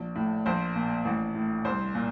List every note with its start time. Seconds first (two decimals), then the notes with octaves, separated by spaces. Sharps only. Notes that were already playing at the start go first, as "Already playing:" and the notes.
Already playing: A#1
0.15 A2
0.46 A#1 C5
0.76 A#2
1.05 A1
1.35 A2
1.65 C2 C5
1.95 A#2